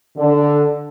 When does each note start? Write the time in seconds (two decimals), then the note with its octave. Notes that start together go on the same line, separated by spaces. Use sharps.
0.17 D3